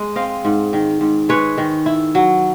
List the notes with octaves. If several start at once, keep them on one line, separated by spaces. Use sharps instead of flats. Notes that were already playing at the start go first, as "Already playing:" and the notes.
Already playing: G#3
C4 D#5 F5
G#2
D#3
G#2
G#3 B4 C#5
D#3
E4
F#3